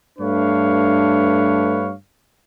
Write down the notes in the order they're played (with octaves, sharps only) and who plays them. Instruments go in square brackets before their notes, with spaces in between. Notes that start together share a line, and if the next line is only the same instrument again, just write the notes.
[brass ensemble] G2 A3 D4 B4 C#5 F5